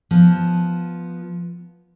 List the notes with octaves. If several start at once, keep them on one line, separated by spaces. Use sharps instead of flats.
F3 B3